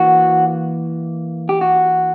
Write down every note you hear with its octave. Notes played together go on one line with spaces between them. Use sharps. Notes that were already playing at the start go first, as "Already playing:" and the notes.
Already playing: E3 A#3 E4 F#4
G4
F#4